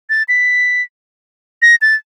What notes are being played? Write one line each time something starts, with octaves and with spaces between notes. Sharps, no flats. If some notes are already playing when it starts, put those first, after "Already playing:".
A6
B6
A#6
A6